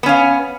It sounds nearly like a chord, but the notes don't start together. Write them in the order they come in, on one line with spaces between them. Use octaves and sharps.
B3 C#4 F5